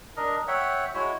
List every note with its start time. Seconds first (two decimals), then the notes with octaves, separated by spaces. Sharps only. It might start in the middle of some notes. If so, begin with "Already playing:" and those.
0.16 D4 A#4 D#5
0.48 C#5 E5 F#5 G5
0.94 G#3 E4 F#4 C#5